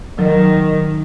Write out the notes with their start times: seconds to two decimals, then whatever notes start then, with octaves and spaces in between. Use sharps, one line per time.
0.19 D#3 F#3